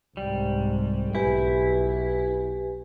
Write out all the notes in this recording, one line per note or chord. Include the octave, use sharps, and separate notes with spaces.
C2 G#2 G3
B1 E4 G4 B4 G#5